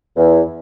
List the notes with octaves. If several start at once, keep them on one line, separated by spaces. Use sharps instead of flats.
E2